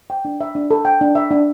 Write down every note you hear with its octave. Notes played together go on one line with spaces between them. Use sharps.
G5
D4
E5
D4
A4
G5
D4
E5
D4